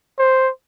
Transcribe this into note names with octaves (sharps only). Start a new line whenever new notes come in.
C5